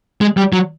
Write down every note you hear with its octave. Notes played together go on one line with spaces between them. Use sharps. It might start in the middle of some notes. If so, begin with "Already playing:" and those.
G#3
G3
F#3